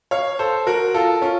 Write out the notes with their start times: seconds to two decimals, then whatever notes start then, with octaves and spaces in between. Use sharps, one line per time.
0.11 C#5 F5
0.39 A4 C5
0.67 F#4 A#4
0.94 F4 A4
1.22 C#4 F4